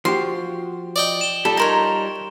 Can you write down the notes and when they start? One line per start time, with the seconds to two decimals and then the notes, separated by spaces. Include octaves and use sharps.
0.05 F3 F#4 G4 C6
0.96 D5 D#5 G5
1.21 E7 G7
1.45 G3 F4 A4
1.57 D#4 A#4 C#5 A#5 C6